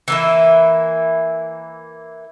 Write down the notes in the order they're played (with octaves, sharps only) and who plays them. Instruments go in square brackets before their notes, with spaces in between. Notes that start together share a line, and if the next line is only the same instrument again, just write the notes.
[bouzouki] E3 A#3 E4